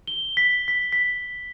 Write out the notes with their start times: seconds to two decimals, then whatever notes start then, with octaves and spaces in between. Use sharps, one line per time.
0.07 G7
0.37 B6
0.68 B6
0.92 B6